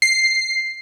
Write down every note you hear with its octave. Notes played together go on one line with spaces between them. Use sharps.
C7